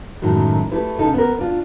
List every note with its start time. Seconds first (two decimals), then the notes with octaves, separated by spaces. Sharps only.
0.22 F#2 A2 D#3 F#3 G#3
0.72 A3 E4 G4 B4
0.99 C#3 D#4 A4
1.14 B3 A#4
1.39 D4 F4